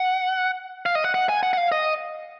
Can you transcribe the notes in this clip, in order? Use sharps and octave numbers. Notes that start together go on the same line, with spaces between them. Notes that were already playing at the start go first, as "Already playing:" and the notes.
Already playing: F#5
F5
D#5
F#5
F#5
G#5
F#5
F#5
F5
D#5